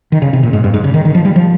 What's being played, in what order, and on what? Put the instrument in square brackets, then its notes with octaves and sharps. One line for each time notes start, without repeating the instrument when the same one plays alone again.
[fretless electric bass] D#3
C#3
C3
A#2
G#2
G2
G#2
C#3
D#3
D#3
F3
G3
F3